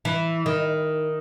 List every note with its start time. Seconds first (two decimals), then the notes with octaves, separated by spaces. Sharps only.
0.05 E3
0.46 D#3